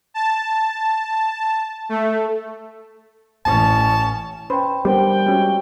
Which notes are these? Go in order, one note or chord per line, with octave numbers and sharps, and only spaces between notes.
A5
A3
A1 C#4 A5
C#4 B4 C5 G5 B5
G3 B3 D4 G4 A#4 C5 G5
G#3 C#4 F#4